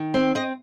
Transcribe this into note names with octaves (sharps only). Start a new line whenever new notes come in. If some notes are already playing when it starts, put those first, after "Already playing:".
Already playing: D#3
C4
C4 D#5